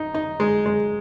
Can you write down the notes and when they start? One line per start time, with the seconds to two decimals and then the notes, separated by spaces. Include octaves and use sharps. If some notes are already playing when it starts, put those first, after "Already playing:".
Already playing: D#4
0.14 D#4
0.40 G#3
0.66 G#3